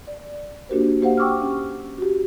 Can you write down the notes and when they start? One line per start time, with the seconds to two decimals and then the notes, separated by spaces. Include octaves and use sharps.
0.07 D5
0.69 A#3 D4 F#4 G4 A#4 C5
1.02 A#3 G4 C5 F5 F#5
1.17 G5 C#6 D6 E6 F6
1.42 C#4 G4
1.98 F#4 G4